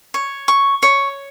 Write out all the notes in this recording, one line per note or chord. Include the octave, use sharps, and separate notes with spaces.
C#5
C#6
C#5